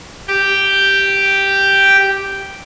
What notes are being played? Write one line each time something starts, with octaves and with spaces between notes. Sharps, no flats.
G4 G5